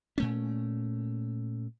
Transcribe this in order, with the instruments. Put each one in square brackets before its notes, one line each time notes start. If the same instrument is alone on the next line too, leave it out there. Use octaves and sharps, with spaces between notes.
[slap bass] A#2 A3 C#4